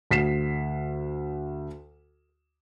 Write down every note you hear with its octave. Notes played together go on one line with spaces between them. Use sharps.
D2 B6 C7 E7